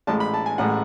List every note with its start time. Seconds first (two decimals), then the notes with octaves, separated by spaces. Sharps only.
0.07 A1 A2 G#3 A5
0.20 B5
0.34 A5
0.46 G#5
0.58 A1 A2 G#3 F#5